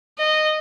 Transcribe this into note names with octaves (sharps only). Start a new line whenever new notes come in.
D#5